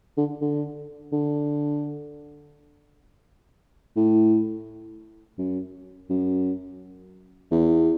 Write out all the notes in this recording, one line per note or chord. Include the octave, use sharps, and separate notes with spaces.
D3
D3
D3
A2
F#2
F#2
E2